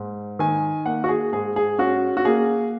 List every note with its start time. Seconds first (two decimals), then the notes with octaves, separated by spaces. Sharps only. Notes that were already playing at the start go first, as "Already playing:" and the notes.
Already playing: G#2
0.39 D#3 G#5
0.85 A#3 F#5
1.04 F#4
1.09 G#4
1.33 G#2 G#4
1.56 G#4
1.78 C#4 F#4
2.17 F#4
2.25 A#3 G#4